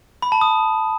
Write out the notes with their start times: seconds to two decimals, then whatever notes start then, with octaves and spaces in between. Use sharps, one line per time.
0.22 B5
0.32 A5
0.41 D#6